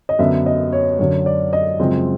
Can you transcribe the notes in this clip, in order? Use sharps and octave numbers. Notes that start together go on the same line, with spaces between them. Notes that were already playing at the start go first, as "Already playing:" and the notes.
D#5
F#2 D3 F#3 B3 E5
D#5
C#5
F#2 D3 F#3 C#5
D5
D#5
F#2 C#3 F3 G#3 C4